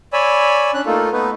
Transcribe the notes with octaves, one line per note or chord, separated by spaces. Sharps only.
C#5 D5 G#5 B5 E6
C#4 D4 F#6
A3 A#3 D#4 F4 A4
A3 B3 D#4 B4